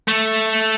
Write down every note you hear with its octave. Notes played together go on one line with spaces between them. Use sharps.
A3